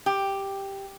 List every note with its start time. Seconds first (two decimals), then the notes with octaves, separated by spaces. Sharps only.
0.06 G4